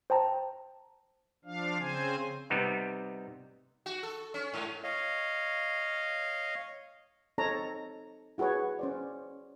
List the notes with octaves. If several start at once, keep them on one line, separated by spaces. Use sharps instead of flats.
C5 G5 A5 A#5
F3 D4 F5
C#3 C4 C5 G#5
C3 G3 B3 D#4
F#4
A4
C#4
G#2
C#5 D#5 F5
C4 D#4 A4 C#5 A5 A#5
E4 F#4 G#4 B4 C#5
C#4 C5 D5